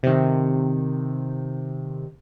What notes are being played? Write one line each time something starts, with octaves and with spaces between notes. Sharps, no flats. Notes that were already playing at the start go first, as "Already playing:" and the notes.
C3 D#3